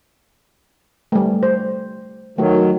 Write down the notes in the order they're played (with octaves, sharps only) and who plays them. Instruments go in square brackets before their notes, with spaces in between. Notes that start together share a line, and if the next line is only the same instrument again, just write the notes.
[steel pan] G3 A3
C5
[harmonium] D#3 F#3 [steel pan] A3 F#4